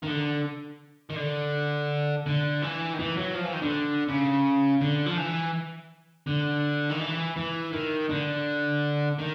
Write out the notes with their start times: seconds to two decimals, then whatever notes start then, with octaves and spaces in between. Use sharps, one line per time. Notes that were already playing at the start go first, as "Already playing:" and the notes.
0.03 D#3
0.08 D3
1.10 D#3
1.16 D3
2.26 D3
2.62 E3
2.93 D#3
2.99 E3
3.17 F#3
3.35 F3
3.45 E3
3.53 D#3
3.62 D3
4.08 C#3
4.81 D3
5.06 F3
5.17 E3
6.27 D3
6.89 D#3
6.99 E3
7.36 E3
7.73 D#3
8.09 D3
9.19 D#3